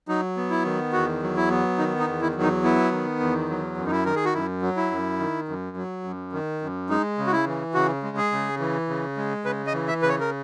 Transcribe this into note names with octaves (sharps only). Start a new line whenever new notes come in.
F#3 D#4
B3
E4
D#3
E2 F#4
F#3
E4
B3
D#3 D#4
D#4
E2
E4
F#3
D#4
B3 E4
D#3
E2
F#3
F#2
D#4
E4
D#3 A#4
G#4
F#4
F#2 E4
F#3
E4
F#2
D#3
F#2
F#3
F#2
D#3
F#2
G#3 D#4
C#3
F#4
E4
E3
C#3 F#4
G#3
G#4
C#3
E3
C#3
G#3
C#3 B4
D#5
E3
E5
C#3 B4
C#5
A#4